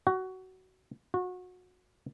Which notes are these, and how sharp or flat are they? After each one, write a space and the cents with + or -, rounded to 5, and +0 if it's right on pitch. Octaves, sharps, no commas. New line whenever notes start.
F#4 +15
F#4 -30